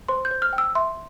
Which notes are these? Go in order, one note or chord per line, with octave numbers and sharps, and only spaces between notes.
C5 C6
G6
C5
F6
G5
E6
E5 C6